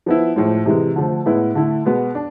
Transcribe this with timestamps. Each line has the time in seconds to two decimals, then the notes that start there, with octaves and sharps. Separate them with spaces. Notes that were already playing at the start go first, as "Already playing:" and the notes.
0.06 F3 B3 E4
0.36 A2 F3 G#3
0.66 C3 E3 G#3
0.96 D3 F3 A3
1.26 A2 G#3 B3 E4
1.55 D3 A3 E4
1.86 B2 G#3 B3
2.15 D4